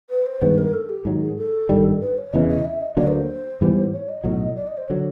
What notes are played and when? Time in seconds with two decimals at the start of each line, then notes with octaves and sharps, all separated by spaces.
0.10 B4
0.26 C5
0.41 G2 D#3 G#3 B3 B4
0.58 A#4
0.73 A4
0.89 G4
1.05 G#2 D#3 F#3
1.21 G#4
1.37 A4
1.69 G#1 G2 D#3 G3
2.01 B4
2.18 C#5
2.33 E1 E2 C#3 E3 D#5
2.48 D#5
2.65 E5
2.81 D#5
2.97 D2 D3 F#3 A#3 D5
3.07 B4
3.12 C5
3.61 G#2 E3 G3 B3
3.92 C#5
4.09 D#5
4.24 B1 A2 F#3
4.56 D5
4.67 D#5
4.77 C5
4.88 D3 F#3 C#5